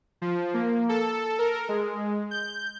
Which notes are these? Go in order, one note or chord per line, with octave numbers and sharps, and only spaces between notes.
F3
A#3
A4
A#4
G#3
G6